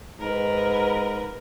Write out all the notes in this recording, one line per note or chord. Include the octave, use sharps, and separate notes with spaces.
G#2 A#4 B4